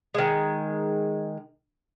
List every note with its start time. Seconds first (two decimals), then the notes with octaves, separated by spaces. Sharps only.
0.14 D#3 G#3